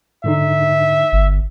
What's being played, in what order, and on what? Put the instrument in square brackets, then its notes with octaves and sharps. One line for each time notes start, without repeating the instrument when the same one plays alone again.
[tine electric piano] G#2 D3 D#4 [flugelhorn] E5
[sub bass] G1